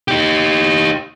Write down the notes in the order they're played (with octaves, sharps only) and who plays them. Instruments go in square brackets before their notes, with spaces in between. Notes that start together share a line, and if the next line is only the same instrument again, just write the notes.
[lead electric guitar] D#4 G4